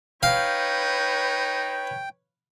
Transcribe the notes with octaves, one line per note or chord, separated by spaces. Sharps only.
D#4 B4 C#5 F5 G5